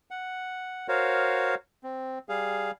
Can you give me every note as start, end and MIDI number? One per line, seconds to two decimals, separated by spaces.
0.11 0.87 78
0.88 1.55 66
0.88 1.55 70
0.88 1.55 72
0.88 1.55 73
0.88 1.55 77
1.84 2.19 60
2.29 2.71 55
2.29 2.71 68
2.29 2.71 77